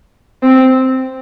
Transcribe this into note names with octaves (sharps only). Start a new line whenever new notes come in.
C4